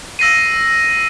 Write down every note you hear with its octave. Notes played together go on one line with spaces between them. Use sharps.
E6 A#6 C7 D#7